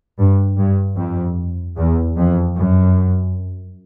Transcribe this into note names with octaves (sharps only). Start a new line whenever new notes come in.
G2
G2
F2
E2
F2
F#2